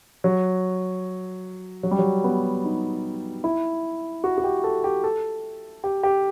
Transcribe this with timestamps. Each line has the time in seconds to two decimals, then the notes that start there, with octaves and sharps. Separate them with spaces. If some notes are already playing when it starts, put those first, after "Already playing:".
0.24 F#3
1.83 F#3
1.91 G3
1.99 F#3
2.24 B3
2.64 D#4
3.44 E4
4.24 F#4
4.38 F#4
4.44 G4
4.64 A4
4.84 G4
5.04 A4
5.84 G4
6.03 G4